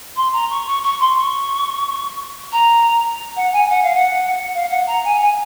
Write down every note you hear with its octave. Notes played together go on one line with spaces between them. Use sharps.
C6
A#5
C#6
C#6
C#6
C6
C#6
A#5
F#5
G#5
F#5
F5
F#5
F5
F#5
A#5
G#5
G#5